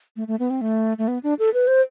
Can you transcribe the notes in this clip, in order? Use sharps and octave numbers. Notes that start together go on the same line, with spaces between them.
A3
A3
B3
C4
A3
A3
B3
D4
A4
B4
C5